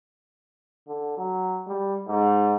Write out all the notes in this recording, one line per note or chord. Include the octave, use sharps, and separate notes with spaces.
D3
F#3
G3
G#2